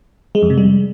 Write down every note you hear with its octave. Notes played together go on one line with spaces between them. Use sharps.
G#3
F2
C3
G3